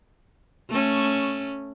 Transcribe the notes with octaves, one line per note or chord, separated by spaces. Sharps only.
A3 C#4